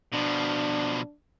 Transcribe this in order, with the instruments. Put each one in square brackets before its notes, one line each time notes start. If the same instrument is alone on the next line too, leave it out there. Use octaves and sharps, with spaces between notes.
[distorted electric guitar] B2 F3 [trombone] D4